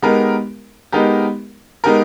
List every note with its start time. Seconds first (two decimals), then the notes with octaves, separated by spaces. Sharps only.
0.02 G#3 B3 D#4 G4 A#4
0.92 G#3 B3 D#4 G4 A#4
1.84 G#3 B3 D#4 G4 A#4